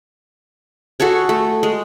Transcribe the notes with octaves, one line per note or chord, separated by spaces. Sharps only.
F#4 G#4 A4 C#5
A3
G#3